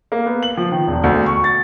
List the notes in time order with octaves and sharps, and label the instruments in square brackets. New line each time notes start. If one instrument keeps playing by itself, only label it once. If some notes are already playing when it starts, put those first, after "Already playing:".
[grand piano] A#3
B3
F#7
F3
D#3
E1
D2
C#6
A6